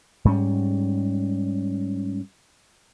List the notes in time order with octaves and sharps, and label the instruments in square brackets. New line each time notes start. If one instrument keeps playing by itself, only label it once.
[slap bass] G#2 G3 C#4